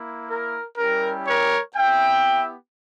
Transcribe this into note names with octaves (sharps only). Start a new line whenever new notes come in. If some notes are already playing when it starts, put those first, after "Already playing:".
Already playing: A#3 E4
A#4
G3 C#4 E4 G4 A#4
A#4 C#5
B3 E4 G4 E5 G5